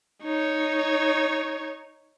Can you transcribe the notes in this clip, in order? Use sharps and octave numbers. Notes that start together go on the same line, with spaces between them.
D#4 C#5